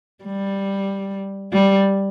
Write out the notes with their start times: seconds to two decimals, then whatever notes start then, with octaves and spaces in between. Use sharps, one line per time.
0.24 G3
1.53 G3